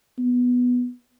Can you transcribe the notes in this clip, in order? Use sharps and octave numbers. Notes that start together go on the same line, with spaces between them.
B3